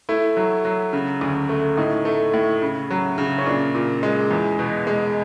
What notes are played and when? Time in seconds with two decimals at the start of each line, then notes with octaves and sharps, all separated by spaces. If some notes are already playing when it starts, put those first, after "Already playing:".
0.09 A3 E4
0.37 F#3
0.65 F#3
0.93 C#3
1.21 D2
1.49 A3
1.77 A2 D#4
2.05 A3
2.34 A2
2.62 C#3
2.91 F#3
3.18 C#3
3.38 C#4
3.46 A#2 D4
3.75 A#2
4.03 G#3
4.31 E2
4.59 B2
4.87 G#3